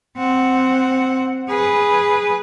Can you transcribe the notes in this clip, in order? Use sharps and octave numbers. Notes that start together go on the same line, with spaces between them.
C4 F#5
G#4 B4